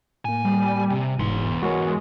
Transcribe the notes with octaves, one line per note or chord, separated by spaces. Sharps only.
A2 A#3 G#5
G3
C3
E1 E2 G#2 C6
G#3 F#4 A#4 C#5